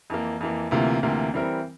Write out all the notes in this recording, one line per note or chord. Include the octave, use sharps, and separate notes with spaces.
F2 E3 A#3
F2 E3 A#3
D2 C3 E3 A#3 F4
D2 C3 E3 A#3 F4
E3 G3 C4 E4 A#4